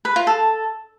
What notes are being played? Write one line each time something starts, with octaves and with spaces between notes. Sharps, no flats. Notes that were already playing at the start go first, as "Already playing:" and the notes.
B4
F4
A4